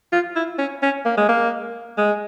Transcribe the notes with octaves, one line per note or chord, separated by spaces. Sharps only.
F4
E4
C#4
C#4
A#3
G#3
A#3
G#3